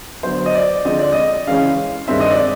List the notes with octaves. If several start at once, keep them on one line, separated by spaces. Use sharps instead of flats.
D3 F#3 B3 C5
D#5
D5
D3 F3 G#3 C4 D#5
D5
D#5
C#3 E3 G#3 C#4 F5
G2 D#3 G#3 C4 E5
D#5
D5